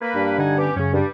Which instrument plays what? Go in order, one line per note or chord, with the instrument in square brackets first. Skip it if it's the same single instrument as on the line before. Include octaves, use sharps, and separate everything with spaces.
[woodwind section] A#3 B4
[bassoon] G2
[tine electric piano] D3 [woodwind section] D#4 F#5 G#5
[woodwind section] B3 C#4 G4
[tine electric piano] F#2 C#3 [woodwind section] C#4
[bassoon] G2 [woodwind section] G3